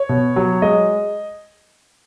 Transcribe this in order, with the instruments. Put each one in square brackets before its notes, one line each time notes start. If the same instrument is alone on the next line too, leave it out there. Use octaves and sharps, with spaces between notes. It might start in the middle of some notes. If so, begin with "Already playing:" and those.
Already playing: [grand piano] C#5
B2
F#3
G#3 D#5